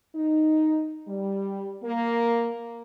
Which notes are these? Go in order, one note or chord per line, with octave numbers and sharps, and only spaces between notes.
D#4
G3
A#3